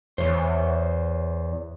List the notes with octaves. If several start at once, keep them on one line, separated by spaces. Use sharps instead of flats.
E2 C5 C#5